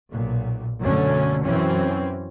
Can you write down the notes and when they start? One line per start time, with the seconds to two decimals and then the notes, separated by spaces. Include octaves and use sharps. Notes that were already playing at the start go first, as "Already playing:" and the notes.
0.11 B1 A#2
0.80 F#2 B2 D3 F#3 A3 C#4
1.45 F#2 E3 C4 C#4